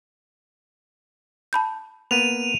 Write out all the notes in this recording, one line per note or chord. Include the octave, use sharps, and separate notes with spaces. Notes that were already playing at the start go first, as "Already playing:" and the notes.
A5 B5 G6
A#3 B3 D#7 F7